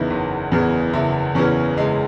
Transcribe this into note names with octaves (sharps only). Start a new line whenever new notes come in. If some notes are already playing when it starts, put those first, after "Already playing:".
Already playing: F#1 E2 C#3 E3 D#4 E4
F#1
E2 C#3 E3
F#1 E4
E2 C#3 E3 C#4
F#1 G#3